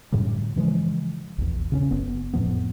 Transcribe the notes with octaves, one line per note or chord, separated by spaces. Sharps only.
F#2 A2 D3 G3
C#3 E3 F3 G#3
A#1 E2
C#3 B3 C#4
F#1 B3
F2 A2 F3 B3